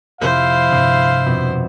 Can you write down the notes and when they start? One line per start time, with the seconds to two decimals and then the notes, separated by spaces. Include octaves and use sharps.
0.21 F2 C3 E4 C5 F5
0.71 G2 C3
1.26 F2 B2 C4